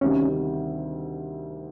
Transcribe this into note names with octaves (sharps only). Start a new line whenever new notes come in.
D2 C3 D#3 G3 C#4